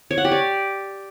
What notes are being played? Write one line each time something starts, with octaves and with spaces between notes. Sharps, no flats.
C#5
F#5
G4
D5